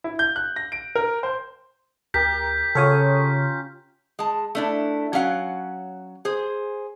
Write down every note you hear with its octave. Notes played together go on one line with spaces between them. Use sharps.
E4
G6
F#6
A#6
D7
A#4
C5
D2 G4 A#4 G6 B6
C#3 C#4 F4 A4 C#5 D#6
G#3 A5
A3 D4 E4
F#3 C#4 F5 F#5
G#4 C5